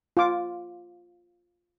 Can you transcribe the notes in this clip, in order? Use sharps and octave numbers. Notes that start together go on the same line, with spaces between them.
F4 D6